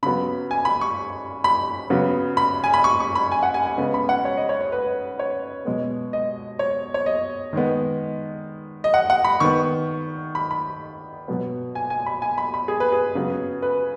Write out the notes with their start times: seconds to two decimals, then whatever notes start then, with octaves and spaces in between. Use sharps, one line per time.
0.03 C#3 F#3 B3 B5
0.51 G#5
0.65 B5
0.81 C#6
1.44 B5
1.90 C#3 F#3 B3
2.37 B5
2.64 G#5
2.74 B5
2.84 C#6
3.00 C#6
3.15 B5
3.32 G#5
3.43 F#5
3.54 G#5
3.66 G#5
3.78 C#3 G#3 B3
3.94 B5
4.09 F#5
4.25 C#5
4.37 D#5
4.49 C#5
4.61 C#5
4.72 B4
5.19 C#5
5.65 B2 G#3 B3
6.13 D#5
6.59 C#5
6.94 C#5
7.06 D#5
7.53 D#3 G#3 B3
8.84 D#5
8.94 F#5
9.10 F#5
9.24 B5
9.40 D#3 B3 C#6
10.35 B5
10.51 B5
11.28 B2 F#3 B3
11.75 G#5
11.90 G#5
12.06 B5
12.22 G#5
12.38 B5
12.54 B5
12.68 G#4
12.80 B4
12.92 G#4
13.15 C#3 F#3 B3
13.62 B4